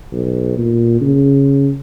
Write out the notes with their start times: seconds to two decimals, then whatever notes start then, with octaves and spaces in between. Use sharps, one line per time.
0.13 B1
0.58 A#2
1.01 C#3